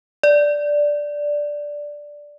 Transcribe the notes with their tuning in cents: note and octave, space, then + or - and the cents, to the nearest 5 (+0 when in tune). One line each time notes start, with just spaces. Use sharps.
D5 +0